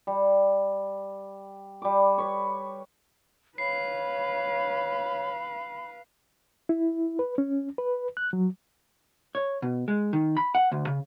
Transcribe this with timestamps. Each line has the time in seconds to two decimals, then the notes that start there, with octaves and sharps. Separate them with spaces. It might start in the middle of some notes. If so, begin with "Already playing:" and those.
0.07 G3
1.82 G3 D6
2.18 B4 C#5
3.58 B4 C#5 F5 B5 C7
6.69 E4
7.19 B4
7.38 C#4
7.78 B4
8.17 F#6
8.33 F#3
9.35 C#5
9.62 B2
9.88 G#3
10.13 D#3
10.37 B5
10.55 F#5
10.72 D2
10.87 C#3